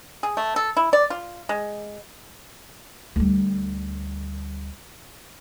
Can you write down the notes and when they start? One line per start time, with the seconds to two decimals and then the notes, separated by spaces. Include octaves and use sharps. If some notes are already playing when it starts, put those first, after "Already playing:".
0.23 G#4
0.37 A3
0.56 A4
0.77 E4
0.93 D5
1.10 F4
1.49 G#3
3.16 D2 G3